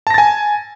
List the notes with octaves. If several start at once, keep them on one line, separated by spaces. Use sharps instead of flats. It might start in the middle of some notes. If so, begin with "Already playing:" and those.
G#5 A5 A6 A#6